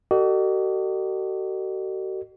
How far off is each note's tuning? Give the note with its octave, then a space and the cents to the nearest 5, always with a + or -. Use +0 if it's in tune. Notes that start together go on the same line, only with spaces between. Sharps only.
F#4 +45 A4 +40 D#5 -40